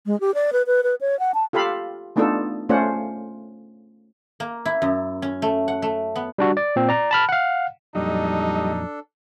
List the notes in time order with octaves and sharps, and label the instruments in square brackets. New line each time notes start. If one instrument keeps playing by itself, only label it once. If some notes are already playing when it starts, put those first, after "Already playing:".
[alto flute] G#3
G4
D5
B4
B4
B4
C#5
F#5
A5
[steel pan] F4 G4 A4 F5 B5
A3 B3 D4 D#4 F4 A4
A3 C#4 F4 C5 D5 F#5
[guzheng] A#3
E4
F#2
C#4
A3
F#5
A3
B3
[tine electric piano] G3 D4 F#4
D5
A#2 C4
D5 A#5
A5 B5 F6
F5 F#5
[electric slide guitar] F2 A#2 F#3 [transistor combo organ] G3 D#5 [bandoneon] D4 A4 [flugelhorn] D#4